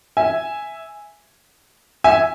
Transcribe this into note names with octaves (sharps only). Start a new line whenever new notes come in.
E5 G#5
E5 G#5